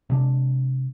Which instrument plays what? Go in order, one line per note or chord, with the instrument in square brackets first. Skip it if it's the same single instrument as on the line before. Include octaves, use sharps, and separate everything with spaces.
[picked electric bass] C3 G#3 D4